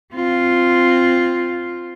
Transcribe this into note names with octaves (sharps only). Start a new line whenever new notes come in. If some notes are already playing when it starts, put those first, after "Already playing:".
C4 F4